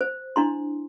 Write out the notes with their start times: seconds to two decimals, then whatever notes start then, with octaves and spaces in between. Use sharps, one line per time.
0.01 C5
0.36 D4 E4 C6